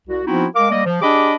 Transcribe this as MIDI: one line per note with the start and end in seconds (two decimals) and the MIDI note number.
0.08 0.21 36
0.08 0.21 66
0.26 0.46 53
0.26 0.46 59
0.26 0.46 60
0.26 0.46 63
0.26 0.46 64
0.26 0.46 66
0.56 0.70 56
0.56 0.70 70
0.56 0.70 77
0.56 0.70 86
0.71 0.82 55
0.71 0.82 58
0.71 0.82 74
0.71 0.82 75
0.85 0.98 53
1.02 1.34 62
1.02 1.34 67
1.02 1.34 68
1.02 1.34 75
1.02 1.34 83
1.02 1.34 86